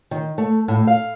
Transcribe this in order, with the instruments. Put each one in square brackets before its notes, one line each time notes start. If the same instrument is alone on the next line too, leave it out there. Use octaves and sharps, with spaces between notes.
[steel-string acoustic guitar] D#3
A3
A2
F5